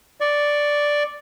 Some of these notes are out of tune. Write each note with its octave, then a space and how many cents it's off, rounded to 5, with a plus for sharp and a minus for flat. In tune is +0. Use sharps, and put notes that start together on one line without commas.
D5 +0 C#6 +0